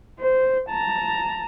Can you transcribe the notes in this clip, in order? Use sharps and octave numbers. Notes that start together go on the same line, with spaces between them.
C5
A5 A#5